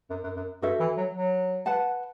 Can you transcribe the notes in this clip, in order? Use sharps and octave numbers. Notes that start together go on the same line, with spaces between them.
F#2
F#2
F#2
G2 F#4 A4 E5
E3
F#3
F#3
B4 F#5 A5